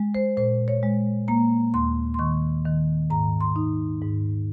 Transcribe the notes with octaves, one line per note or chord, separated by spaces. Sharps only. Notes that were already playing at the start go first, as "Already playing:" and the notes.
Already playing: G#3
C5
A#2 C5
C#5
G#3
A#3 A#5
D#2 C6
C6
D#3 C#6
D#3
G#2 A#5
C6
D#4
G#2